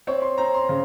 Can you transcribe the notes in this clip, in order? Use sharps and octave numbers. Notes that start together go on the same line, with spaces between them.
C4 C#5
C6
C4 A#5
C6
C#3